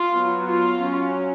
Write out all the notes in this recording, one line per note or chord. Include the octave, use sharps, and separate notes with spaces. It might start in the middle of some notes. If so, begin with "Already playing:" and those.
Already playing: F4
F#3 B3
F4
F#3 C#4